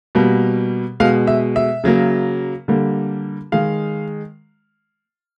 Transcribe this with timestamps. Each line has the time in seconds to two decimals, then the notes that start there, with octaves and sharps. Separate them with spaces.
0.15 B2 G3 A#3
1.00 B2 G#3 F5
1.27 E5
1.56 E5
1.84 C#3 F#3 A#3
2.68 D3 G3 A#3
3.52 D#3 G#3 F5